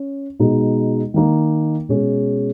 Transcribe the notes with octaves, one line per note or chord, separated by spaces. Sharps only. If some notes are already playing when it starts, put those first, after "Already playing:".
Already playing: C#4
B2 G#3 D#4
D#3 A#3 D#4
B2 G#3 C#4 G#4